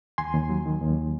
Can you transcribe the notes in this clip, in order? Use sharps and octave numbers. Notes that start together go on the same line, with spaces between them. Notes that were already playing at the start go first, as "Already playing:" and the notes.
D#2 G#5 C6
D#2
F#3
D#3
D#2